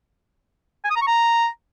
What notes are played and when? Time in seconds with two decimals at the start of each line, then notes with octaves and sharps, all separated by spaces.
0.85 G#5
0.90 D#6
0.96 A#5
1.02 C#6
1.07 A#5